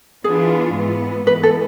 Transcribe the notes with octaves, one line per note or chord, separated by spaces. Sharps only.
E3 B3 D4 F4 G#4
G#2 E3 B3
G#2 E3 G#3 B3 B4
A4